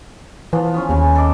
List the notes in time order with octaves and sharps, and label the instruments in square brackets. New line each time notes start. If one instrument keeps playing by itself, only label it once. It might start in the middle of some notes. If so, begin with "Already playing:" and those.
[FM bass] E3 [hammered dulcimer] F3 B3
[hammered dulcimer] B3 C#4 F4
[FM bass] D#2 [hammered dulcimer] C#3 G#5
[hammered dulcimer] A4 D#5 D6